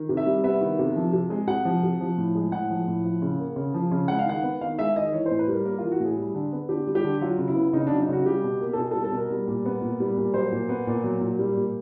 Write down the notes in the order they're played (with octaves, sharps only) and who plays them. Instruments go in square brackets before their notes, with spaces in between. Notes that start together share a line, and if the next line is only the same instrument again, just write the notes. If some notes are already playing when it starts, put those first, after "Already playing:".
Already playing: [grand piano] D#3
C3
E5
G3
B3 E5
D#3
C3
F3
C3
G#3
C3 F#5
F3
C3
F3
A2
G#3
A2 F#5
F3
A2
F3
C#3
A#3
C#3
F3
C#3
G#3 F#5
F5
D#3 F#5
B3
D#3 F5
G#3 E5
D#3 D#5
E3 C#5
C5
A2
B4
G3 A#4
A#3 A#4
E3 F4
F#4
A2
G#4
G3
D3
B3
D3 G4
G3
G4
D3
F#3 F4
C#3
E4
B3
C#3 D#4
D4
F#3
D#4
C#3 F#4
G3 G4
B2
A#3
A4
B2 G#4
A4
G3
A4
B2
A#4
G3
A#2
B3
A#2
G3
A#2
F#3 C5
A#2
B3
A#2
F#3
A#2
G3
A#2